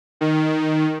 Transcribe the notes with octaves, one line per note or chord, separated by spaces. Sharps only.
D#3